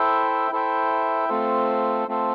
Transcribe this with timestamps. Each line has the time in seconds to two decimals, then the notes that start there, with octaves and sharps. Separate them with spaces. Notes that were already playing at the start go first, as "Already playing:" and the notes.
Already playing: E4 A4 C5 E5 G5
0.51 E4 A4 C5 E5 G5
1.29 A3 C4 F4 A4 C5
2.08 A3 C4 F4 A4 C5